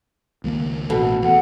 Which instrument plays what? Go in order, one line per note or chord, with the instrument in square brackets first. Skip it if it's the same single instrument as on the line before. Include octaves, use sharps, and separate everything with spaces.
[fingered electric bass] C#2 D#3 A#3
[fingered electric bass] A1 [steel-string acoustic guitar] B2 [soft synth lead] A4
[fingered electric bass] E2 [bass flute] F#5